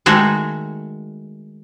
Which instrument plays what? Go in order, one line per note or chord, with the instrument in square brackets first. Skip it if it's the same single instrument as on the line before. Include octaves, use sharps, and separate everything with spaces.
[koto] D#3 G#3 A3 F#4